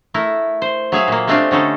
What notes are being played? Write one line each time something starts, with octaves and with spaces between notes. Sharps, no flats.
A3 E4 A#4
C5
F#3 G#4 E5 F5
A#2 A#3
G#3 A3 C4 D4 F4 G4
D3 C#4 D#4 A4